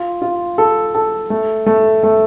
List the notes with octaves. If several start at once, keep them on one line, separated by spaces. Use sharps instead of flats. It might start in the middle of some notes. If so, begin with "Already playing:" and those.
Already playing: F4
F4
A4
A4
A3
A3
A3